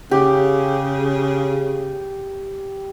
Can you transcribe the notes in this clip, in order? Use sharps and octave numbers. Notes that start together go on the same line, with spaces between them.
C#3 G4